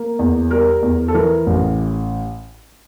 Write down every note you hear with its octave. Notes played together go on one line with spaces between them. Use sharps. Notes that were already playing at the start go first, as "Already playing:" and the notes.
Already playing: A#3
E2
G3 A#4
E2
A4
E3 A#4
A1